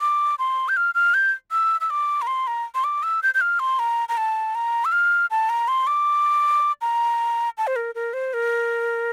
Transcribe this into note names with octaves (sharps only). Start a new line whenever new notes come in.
D6
C6
G6
F6
F6
G6
E6
E6
D6
A#5
C6
A#5
C6
D6
E6
G6
G6
F6
C6
A#5
A#5
A5
A#5
E6
F6
A5
A#5
C6
D6
A#5
A5
C5
A#4
A#4
C5
A#4